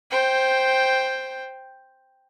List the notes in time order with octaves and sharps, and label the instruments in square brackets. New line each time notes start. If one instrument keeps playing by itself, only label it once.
[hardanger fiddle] C5 G5